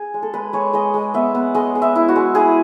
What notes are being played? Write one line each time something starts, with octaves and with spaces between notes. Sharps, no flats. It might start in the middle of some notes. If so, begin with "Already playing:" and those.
Already playing: G#4
G#3
A4
G#3 B4
G#3 C#5
G#3 D#5
G#3
B3 E5
B3
G#3 D#5
G#3
E5
E4
F#4
G#3
E4 G#4